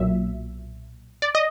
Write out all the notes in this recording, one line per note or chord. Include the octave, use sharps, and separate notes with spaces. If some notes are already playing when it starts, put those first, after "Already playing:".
Already playing: B1 A#2 F#3 E5
D5
D#5